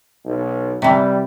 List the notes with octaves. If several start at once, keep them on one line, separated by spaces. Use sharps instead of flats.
B1
C3 E3 G3